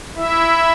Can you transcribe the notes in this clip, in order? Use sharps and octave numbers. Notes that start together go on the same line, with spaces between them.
E4 E5